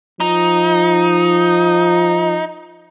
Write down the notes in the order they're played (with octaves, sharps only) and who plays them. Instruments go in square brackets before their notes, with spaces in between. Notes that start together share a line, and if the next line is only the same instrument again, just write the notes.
[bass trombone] F3 [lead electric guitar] D#4